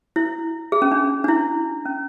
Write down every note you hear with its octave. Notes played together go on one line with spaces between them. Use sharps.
E4
G#4
C#4
D4
D4
E4
C#4